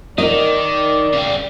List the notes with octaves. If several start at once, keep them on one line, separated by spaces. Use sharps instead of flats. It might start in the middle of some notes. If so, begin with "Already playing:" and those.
D#3 A#4 D5 D#5
C#3 G3